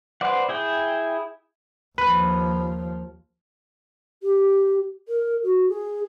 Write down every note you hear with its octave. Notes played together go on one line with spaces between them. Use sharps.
B4 C5 D5 F#5
E4 G#4 G5
D#2 F3 B4
G4
A#4
F#4
G#4